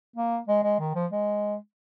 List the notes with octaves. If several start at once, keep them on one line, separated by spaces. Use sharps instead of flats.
A#3
G#3
G#3
D#3
F3
G#3